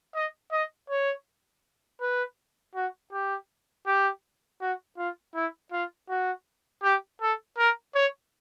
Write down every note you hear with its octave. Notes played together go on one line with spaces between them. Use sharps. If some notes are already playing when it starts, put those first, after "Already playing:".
D#5
D#5
C#5
B4
F#4
G4
G4
F#4
F4
E4
F4
F#4
G4
A4
A#4
C#5